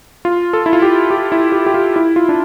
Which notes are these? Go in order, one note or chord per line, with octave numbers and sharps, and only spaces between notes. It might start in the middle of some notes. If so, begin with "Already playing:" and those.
F4
A4
E4
F4
G4
G4
E4
G4
G4
F4
E4
F4
D4